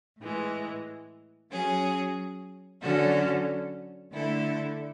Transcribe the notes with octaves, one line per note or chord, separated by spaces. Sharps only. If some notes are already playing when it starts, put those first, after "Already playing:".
A2 E3 G#3
F#3 C#4 G#4
D3 F#3 C#4 F#4 A4
D3 A3 E4 A4